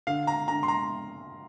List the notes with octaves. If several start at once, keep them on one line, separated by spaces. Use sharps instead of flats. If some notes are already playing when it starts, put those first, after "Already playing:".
D3 F5
A#5
D3 A#5
C6
A#5